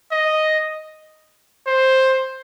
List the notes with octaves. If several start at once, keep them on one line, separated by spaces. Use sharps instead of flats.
D#5
C5